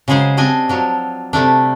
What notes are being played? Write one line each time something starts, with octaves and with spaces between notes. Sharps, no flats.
C#3 F#3 G#3 G#4 C5
G3 C4 D4 D#5 G#5
F3 F#3 D4
C3 G3 A3 D4